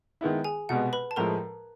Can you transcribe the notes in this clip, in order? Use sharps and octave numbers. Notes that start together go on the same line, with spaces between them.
D#3 G#3 B3 E4
G#4 G#5
C2 B2 G#3 B3 F#5
B4 B5
A5
A2 F3 G#3 A#4 A#5